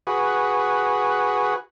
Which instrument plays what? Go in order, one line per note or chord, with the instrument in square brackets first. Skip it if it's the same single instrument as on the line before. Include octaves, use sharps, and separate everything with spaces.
[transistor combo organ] F#4 G#4 B4